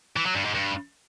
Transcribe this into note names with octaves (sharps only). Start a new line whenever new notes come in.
E3
F#3
G2
G#2
G2